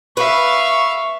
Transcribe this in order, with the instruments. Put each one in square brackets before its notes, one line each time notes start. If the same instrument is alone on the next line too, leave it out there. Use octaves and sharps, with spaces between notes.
[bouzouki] B4 [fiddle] E5 F5 [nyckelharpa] C#6